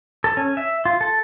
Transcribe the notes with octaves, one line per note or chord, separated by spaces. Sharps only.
A4
C#4
E5
F4
A4